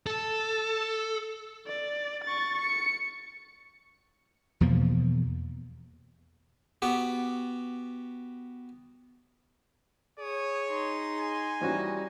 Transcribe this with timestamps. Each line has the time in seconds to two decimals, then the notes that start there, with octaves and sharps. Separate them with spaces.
0.07 A4
1.67 D5
2.24 C#6 A6
2.62 C#7
4.61 E2 B2 F3 A#3
6.82 B3 F#4 G4
10.19 G#4 C#5 D#6
10.69 D#4 C6
11.21 G#5
11.61 E3 G3 C#4 D#4 F#4